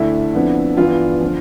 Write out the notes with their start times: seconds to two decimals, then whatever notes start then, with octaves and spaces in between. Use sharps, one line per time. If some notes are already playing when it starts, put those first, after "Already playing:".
Already playing: D2 D3 A3 D4 E4
0.33 F2 D3 F3 B3 D4
0.77 G2 E3 B3 D4 F4
1.21 D3 F3